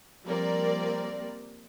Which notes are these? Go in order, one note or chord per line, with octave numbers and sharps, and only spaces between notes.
F3 G3 A#3 C4 A#4 D5